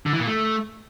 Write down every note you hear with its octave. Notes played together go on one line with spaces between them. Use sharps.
D3
E3
A#2
A3